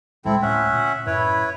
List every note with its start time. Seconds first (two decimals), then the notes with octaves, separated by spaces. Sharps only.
0.25 C#2 A2 G#3 C4 E4 A4
0.42 D2 A2 C#4 E5 F#5
0.73 A#2
1.07 F#2 A2 E4 B4 C#5